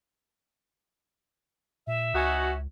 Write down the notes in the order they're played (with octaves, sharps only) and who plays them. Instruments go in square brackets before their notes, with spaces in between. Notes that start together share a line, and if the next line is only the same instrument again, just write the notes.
[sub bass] A#2 [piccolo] E5
[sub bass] C#2 [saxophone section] C#4 D#4 F#4